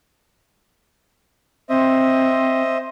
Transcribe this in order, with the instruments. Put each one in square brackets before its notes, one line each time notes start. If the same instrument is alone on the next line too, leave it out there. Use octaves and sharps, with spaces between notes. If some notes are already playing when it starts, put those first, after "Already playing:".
[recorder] C4 [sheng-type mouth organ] C5 D#5 E5